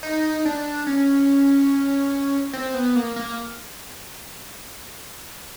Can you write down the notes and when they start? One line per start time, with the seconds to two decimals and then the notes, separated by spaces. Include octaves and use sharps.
0.03 D#4
0.45 D4
0.87 C#4
2.53 C4
2.74 B3
2.96 A#3
3.16 A#3